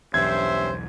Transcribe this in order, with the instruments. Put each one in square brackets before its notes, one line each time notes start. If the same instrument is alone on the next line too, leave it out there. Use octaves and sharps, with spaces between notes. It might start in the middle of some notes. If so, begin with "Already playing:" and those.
[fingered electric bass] B1 E2 [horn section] G2 C#4 C5 [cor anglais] E5 [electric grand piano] G#6